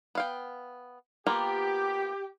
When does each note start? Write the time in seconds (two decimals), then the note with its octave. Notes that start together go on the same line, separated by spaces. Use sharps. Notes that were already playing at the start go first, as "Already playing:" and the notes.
0.15 B3 F5 G5
1.26 A#3 B3 F4 G4